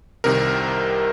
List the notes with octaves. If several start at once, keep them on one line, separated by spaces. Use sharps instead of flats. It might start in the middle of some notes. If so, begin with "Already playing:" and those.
C2 C3 D#3 A#4